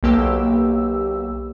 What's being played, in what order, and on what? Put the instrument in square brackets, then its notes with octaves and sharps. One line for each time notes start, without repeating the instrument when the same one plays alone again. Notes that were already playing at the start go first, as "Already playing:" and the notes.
[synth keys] B1 A#3 G4 E6